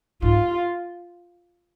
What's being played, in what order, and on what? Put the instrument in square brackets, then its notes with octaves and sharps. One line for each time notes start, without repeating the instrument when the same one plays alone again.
[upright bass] G#2 [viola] F4